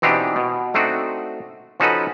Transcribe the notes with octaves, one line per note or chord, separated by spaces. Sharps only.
B2 E3 C4 D4 D#4 G4
B2
A3 C4 D4 D#4 F#4
F3 C#4 D#4 F#4 A4 B4